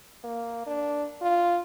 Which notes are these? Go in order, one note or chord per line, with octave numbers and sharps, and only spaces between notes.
A#3
D4
F4